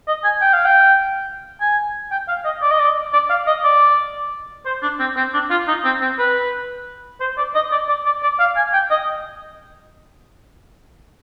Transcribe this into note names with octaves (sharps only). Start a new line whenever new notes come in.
D#5
G#5
G5
F5
G5
G#5
G5
F5
D#5
D5
D#5
D5
D5
F5
D#5
D5
C5
D4
C4
C4
D4
F4
D#4
C4
C4
B4
C5
D5
D#5
D5
D5
D5
D5
F5
G#5
G5
D#5